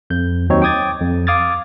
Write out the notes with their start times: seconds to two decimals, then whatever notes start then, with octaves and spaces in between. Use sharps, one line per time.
0.10 F2 G6
0.49 D#2 F#3 C4 D#4 C#5
0.62 G5 D6 D#6 G#6 A6
1.01 F2
1.27 F5 D6 D#6 F6 G#6 A6